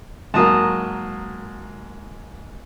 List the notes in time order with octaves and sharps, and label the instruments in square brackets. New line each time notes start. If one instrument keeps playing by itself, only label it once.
[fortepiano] G#2 F#3 A#3 [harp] A5 A#5 D#6